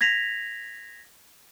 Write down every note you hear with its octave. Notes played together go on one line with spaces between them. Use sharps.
G#6 A#6 B6 F7